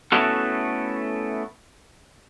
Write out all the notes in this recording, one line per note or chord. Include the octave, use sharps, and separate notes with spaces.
A3 B3 C#4 E4 F#4 A4